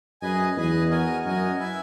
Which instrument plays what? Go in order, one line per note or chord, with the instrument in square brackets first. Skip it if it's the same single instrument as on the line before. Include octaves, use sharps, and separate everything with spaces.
[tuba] F#2 [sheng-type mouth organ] G#4 B4 D#5 G#5
[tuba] E2 [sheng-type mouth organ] G#4 B4 D#5 G#5
[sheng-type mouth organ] F#4 A#4 D#5 G#5
[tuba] F#2 [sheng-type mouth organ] F#4 A#4 D#5 G#5
[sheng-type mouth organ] E4 B4 E5 G#5